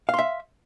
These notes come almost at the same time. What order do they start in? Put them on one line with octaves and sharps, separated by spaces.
F5 C6 E5